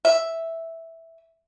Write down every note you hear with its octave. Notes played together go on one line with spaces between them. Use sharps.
E5